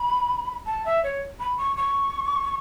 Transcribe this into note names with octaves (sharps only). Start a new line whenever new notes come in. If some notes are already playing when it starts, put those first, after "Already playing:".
Already playing: B5
A5
E5
C#5
B5
C#6
C#6